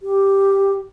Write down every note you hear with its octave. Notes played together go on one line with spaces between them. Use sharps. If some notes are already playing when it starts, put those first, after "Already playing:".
G4